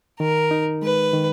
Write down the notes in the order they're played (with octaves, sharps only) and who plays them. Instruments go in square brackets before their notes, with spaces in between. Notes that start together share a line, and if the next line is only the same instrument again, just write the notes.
[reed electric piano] D#3 [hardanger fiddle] A#4
[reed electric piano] D#4
[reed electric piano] G#3 [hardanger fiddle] B4
[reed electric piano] D#3